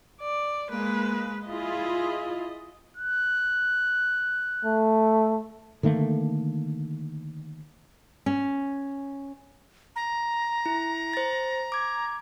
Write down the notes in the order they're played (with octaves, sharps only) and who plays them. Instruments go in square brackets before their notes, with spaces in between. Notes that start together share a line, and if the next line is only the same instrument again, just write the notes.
[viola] D5
[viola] G#3 B4 [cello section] A#3
[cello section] E4 F4 G#4 [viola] D#5
[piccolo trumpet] F#6
[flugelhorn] A3
[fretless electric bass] D3 D#3 A3 A#3
[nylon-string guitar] C#4
[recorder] A#5
[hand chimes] E4
C5 A6
D6 G#6